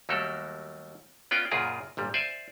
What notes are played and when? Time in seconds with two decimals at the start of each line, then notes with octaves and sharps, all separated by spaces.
0.09 D#2 F#3 G3 A3 A4 A#4
1.31 B3 C#4 F4 D5 G5
1.51 F#2 A#2 C#3 F4 G#4 A#4
1.97 G1 A#2 G3
2.14 C5 D5 E5 G#5